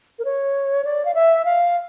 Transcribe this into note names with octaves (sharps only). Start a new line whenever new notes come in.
A#4
C#5
D5
F5
E5
F5